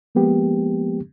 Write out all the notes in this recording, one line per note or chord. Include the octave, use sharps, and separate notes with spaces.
F3 G#3 A#3 B3 G4